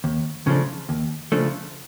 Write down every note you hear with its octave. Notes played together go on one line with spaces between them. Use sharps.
D#2
C#3 F3 A3 D4
D#2
C#3 F3 A3 D4